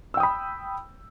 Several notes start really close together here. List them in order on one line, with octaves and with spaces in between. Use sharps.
E6 G5 D#6 B5